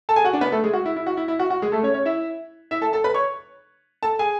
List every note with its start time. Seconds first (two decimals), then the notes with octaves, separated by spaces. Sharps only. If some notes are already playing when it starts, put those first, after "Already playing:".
0.09 A4 A5
0.16 G#4 G#5
0.25 F#4 F#5
0.33 D4 D5
0.41 B3 B4
0.52 A3 A4
0.64 G#3 G#4
0.73 F#4
0.86 E4
0.96 E4
1.07 F#4
1.17 E4
1.28 E4
1.39 F#4
1.50 F#4
1.62 G#3 G#4
1.72 A3 A4
1.83 C#4 C#5
1.94 C#4 C#5
2.05 E4 E5
2.71 E4 E5
2.82 A4 A5
2.93 A4 A5
3.04 B4 B5
3.14 C#5 C#6
4.03 A4 A5
4.19 G#4 G#5